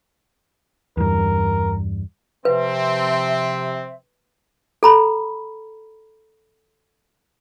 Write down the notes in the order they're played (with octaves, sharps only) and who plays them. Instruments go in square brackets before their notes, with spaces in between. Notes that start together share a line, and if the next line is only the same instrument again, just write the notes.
[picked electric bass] E2 G2 [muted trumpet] A#4
[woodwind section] C3 F3 E5 [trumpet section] C4 [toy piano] B4
[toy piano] A4 A#5 B5